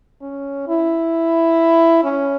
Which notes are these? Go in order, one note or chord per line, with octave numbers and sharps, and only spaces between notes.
C#4
E4
C#4